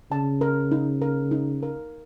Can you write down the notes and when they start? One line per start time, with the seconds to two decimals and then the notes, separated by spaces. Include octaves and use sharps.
0.11 C#3 A5
0.41 A#4
0.71 D#4
1.02 A#4
1.31 D#4
1.63 A#4